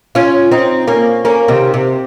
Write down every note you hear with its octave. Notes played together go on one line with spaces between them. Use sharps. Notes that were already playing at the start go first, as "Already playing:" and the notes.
C#4 F4
C4 D#4
A#3 C#4
A#3 C#4
C3 D#3
C3